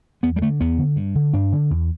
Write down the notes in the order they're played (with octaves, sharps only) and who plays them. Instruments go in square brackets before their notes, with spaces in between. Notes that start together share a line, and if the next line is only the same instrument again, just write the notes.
[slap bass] E2 B3
G3
D3 A3
E2 B3
D3
G2
D3
G2 D4
D3
E2